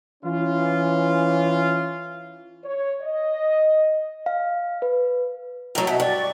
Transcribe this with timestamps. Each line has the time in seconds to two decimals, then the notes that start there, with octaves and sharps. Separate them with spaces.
0.24 E3 C#4 F4
2.65 C#5
3.02 D#5
4.26 F5
4.82 B4
5.75 A2 F#3 A#5
5.87 B2 D#5 E5
6.00 G2 D5 C#6